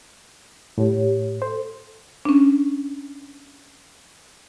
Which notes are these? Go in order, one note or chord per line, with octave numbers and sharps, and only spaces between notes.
A2 G4 C#5
A4 C5
C#4 D4